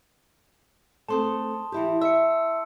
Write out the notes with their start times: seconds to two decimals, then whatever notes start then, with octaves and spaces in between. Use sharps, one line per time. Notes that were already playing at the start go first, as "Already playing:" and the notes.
1.08 A3 C4 A4 A5 C6 D#6
1.72 E3 E4 G4
2.02 E5 E6 C#7